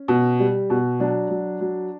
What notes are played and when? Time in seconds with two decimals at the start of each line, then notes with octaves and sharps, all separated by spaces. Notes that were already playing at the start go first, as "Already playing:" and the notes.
Already playing: C#4
0.08 B2
0.40 G3
0.70 B2
1.00 F#3 D4
1.30 F#3
1.61 F#3